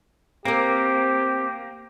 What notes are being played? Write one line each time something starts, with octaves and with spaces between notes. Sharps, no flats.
A#3 C4 G4 A#4